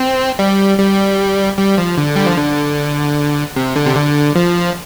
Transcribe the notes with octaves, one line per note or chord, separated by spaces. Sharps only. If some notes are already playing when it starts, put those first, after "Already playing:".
Already playing: C4
G3
G3
G3
F3
D3
G3
F3
D3
C3
D3
C3
D3
F3